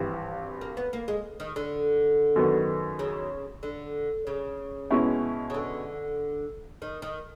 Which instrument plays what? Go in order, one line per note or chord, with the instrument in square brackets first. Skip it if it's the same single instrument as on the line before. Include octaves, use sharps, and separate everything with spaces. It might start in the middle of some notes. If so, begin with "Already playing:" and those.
Already playing: [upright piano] G#1 G2 E3 [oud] C4
[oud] A#3
B3
A#3
G#3
D#3
D3
[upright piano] F#2 D#3 F#3 B3
[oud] C#3
D3
C#3
[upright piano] B2 G#3 C#4 E4
[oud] C#3
D3
D#3
D#3